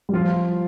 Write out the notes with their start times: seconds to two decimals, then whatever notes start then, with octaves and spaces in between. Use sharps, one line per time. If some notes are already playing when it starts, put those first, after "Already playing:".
0.09 G3
0.13 F3 F4